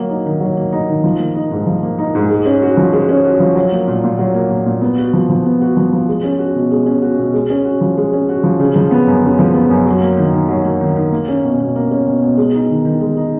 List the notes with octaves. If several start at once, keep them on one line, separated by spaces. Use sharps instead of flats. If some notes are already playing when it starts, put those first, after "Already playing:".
Already playing: F#3 A#3
D#4
D#3
F#3
A#3
D#4
D#3
F3
A#3
D#4
G#2
F3
A#3
D#4
G#2
G#3
C#4
F#4
F3
G#3
C#4
F#4
F3
F#3
A#3
A#2
A#2
F#3
A#3
A#2
A#2
B3
F#4
F3
F3
B3
F#4
F3
F3
G#3
C#4
F#4
B2
G#3
C#4
F#4
B2
G#3
C#4
F#4
F3
G#3
C#4
F#4
F3
C#3
F3
B3
F#2
C#3
F3
B3
F#2
F#3
A#3
D#3
D#3
F#3
A#3
D#3
D#3
A#3
C#4
B2
B2
A#3
C#4
B2
B2
G#3
D#4
D#3
D#3
G#3
D#4